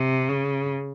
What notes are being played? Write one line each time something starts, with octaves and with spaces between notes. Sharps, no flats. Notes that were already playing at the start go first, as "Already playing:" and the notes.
Already playing: C3
C#3